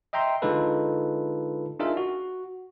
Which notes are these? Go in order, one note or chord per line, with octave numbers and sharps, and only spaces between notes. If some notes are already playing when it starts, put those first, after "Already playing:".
D#5 E5 G5 A#5 C6
D3 G#3 D#4 F4 A4 B4
D4 D#4 F4 G#4 A#4 E5
F#4